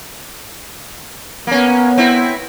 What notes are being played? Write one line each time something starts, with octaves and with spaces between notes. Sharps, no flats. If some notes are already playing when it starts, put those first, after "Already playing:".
A#3 B3 C#4
C4 E4